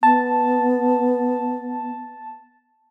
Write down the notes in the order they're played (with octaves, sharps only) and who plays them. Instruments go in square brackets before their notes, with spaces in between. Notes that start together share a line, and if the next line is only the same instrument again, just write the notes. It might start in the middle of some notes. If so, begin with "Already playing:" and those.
[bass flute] B3 [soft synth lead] A5